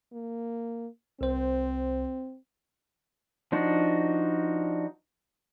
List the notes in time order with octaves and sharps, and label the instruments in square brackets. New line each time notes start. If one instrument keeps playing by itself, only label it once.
[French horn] A#3
[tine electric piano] C2 C5 [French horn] C4
[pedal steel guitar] F3 D4 D#4 F#4